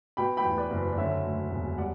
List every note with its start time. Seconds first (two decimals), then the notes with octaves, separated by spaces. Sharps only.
0.17 B2 G5 B5
0.37 G5 B5
0.45 E2
0.57 B4 D5
0.71 F#1
0.78 B4 D5
0.92 D5
0.97 D3 C#5 E5
1.24 D2
1.51 E1
1.78 G3 D5 F#5